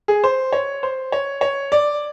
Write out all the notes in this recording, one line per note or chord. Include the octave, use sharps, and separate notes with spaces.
G#4
C5
C#5
C5
C#5
C#5
D5